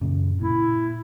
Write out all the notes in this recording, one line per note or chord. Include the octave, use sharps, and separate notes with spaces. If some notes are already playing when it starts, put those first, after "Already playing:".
F#2 A#2 C#3
A#2 E4